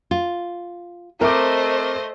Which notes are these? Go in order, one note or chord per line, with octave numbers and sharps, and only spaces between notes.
F4
A3 C4 A#4 C5 D#5 E5 D6